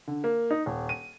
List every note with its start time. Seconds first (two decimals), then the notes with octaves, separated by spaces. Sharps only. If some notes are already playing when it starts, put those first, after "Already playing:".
0.07 D3
0.24 A#3
0.51 D#4
0.66 D#1
0.89 D#7